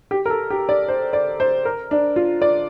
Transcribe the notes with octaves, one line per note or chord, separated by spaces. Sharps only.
G4
A#4
A4
G4
D5
C5
D5
C5
A#4
D4
F4
D5